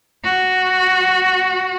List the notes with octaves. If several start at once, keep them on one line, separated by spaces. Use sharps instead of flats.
F#4